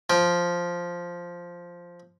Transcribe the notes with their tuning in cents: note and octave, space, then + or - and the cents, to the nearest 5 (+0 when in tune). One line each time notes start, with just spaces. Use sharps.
F3 +0 G5 +10